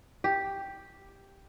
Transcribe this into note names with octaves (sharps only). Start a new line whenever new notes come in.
G4